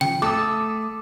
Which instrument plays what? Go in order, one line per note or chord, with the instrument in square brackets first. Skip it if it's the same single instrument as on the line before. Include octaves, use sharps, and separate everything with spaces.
[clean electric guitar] C#3 F3 [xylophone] G5
[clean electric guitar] A3 [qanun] A4 [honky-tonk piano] D6 D#6